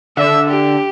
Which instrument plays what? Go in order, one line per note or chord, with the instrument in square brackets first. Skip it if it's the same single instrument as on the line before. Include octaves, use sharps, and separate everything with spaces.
[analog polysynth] D3 [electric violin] E5 E6
[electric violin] G4